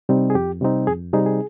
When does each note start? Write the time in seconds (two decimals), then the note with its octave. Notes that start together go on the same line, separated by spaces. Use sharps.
0.09 C3 G3 C4 D#4
0.30 G#4
0.35 F2 G4
0.61 C3 G3 C4 D#4
0.87 F2 G#4
1.13 C3 G3 C4 D#4 G#4
1.26 G#4